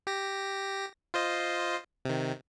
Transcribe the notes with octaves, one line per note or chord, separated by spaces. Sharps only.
G4 A#6
F4 C5 D#5
C3 D#3